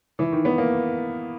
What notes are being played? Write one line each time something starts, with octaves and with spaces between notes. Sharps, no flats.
E3
D#3
B3
A#3